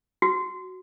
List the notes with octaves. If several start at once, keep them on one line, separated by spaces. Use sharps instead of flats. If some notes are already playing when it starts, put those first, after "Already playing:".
F#4